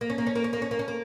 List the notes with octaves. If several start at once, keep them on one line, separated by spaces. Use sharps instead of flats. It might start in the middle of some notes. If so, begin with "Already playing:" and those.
A#3
C#4
A#3
C#4
A#3
C#4
A#3
C#4
A#3
C#4
A#3